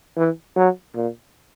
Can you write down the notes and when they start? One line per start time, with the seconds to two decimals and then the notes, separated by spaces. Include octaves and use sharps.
0.17 E3
0.56 F#3
0.96 A#2